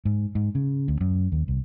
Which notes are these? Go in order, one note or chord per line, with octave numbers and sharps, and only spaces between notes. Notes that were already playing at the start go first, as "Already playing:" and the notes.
G#2
G#2
C#3
D2
F#2
D#2
C2